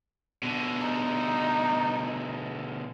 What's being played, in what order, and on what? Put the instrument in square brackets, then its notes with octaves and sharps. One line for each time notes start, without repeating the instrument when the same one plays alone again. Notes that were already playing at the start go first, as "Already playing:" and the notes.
[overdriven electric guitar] B2 D3
[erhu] D#4